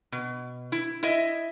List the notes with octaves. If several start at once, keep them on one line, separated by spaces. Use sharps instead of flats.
B2
E4
E4 D#5 E5